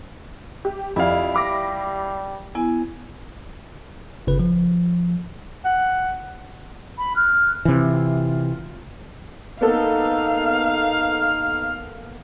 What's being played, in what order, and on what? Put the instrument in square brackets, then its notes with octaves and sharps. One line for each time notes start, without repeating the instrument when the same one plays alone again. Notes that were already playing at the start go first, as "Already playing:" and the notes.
[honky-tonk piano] G4
[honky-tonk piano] F2 [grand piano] E4 F5 [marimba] G4 D5
[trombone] G3 [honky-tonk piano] B5 D6 A#6
[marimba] B3 E4 [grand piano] G#5
[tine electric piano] G1 C#3 B4
F3
[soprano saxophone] F#5
[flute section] B5
F6 F#6
[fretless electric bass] C3 E3 [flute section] F4
[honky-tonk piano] A#3 B3 A4 [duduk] D#4 [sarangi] F5
[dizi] F6